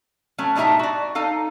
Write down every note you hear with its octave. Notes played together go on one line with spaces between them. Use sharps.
F#3 A3 C#4
A2 D4 D#4 G4 E5 A#5
F#4 D5
D#4 A4 F5